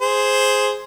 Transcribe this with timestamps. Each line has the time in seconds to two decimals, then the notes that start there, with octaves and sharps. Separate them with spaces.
0.01 G#4 C5